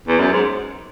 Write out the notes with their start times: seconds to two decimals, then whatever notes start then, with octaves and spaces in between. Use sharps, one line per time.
0.07 E2
0.19 F#2
0.33 G#2